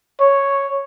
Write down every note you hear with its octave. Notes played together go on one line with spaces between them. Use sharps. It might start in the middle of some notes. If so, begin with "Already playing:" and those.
C#5